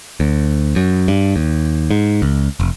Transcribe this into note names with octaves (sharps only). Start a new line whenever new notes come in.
D2
F#2
G2
D#2
G#2
C#2
F1